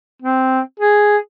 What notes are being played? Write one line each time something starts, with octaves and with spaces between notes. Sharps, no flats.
C4
G#4